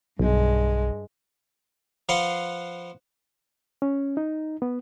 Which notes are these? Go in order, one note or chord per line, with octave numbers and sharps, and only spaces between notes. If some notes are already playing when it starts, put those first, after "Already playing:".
B1 G2 G#3
F3 B4 F5 F#5 C6
C#4
D#4
B3